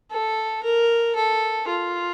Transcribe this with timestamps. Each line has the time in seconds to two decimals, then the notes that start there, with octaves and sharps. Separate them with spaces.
0.11 A4
0.64 A#4
1.16 A4
1.67 F4